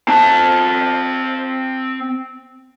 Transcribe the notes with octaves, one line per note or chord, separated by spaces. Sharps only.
C4 A5